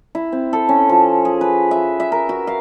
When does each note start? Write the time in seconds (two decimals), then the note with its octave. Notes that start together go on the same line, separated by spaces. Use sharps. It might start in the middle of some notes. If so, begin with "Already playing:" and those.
0.15 E4
0.32 C4
0.53 A4
0.69 C#4
0.89 F3
1.25 G#4
1.41 B4
1.71 E5
2.00 E5
2.12 A#4
2.29 F#4
2.47 F5